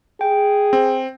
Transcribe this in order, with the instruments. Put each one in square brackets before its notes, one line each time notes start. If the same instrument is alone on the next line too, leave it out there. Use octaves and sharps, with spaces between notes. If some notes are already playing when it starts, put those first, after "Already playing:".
[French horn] G#4 [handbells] G5
[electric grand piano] C4